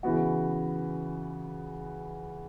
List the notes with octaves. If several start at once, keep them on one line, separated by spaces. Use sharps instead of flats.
C#3 E3 B3 F#4